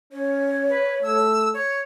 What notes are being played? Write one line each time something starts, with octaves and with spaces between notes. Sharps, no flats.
C#4 C#5
B4
A3 E6
C#5